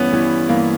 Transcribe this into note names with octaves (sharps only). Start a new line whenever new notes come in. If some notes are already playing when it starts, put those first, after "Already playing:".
Already playing: G2 E3 B3 C#4
G2 E3
G2 E3 A#3